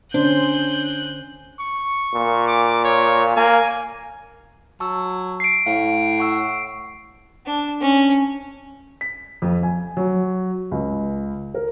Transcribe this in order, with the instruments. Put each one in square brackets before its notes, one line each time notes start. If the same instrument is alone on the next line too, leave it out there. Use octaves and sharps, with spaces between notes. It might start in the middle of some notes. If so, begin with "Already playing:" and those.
[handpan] D3 C#4 C5 [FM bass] D4 [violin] F#6 G6
[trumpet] C#6
[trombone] A#2
[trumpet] D6
C#5
[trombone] A#3 [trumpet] G#5
[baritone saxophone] F#3 [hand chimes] A5 C#6 E6
[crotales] C7 D7
[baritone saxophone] A2 [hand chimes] F5
[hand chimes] F#5 C#6 E6
[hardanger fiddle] D4
C#4
[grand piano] B6
F2
G#5
F#3
C#2
A#4